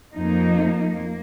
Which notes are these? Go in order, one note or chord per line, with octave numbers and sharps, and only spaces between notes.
F2 F3 A#3 D#4
A#3